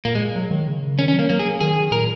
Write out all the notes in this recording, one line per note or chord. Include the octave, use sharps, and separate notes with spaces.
A#2 A#3
G#3
F#3
D#3
C#3
D#3 C#4
C#4
F#3 A#3
F#3 A#3
G#4
D#3 G#4
A#2 A#4